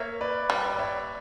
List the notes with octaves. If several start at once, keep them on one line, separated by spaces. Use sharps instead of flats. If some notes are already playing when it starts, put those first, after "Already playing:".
Already playing: A#3 C#5 E5
B4 D5
G3
D5
C#5 E5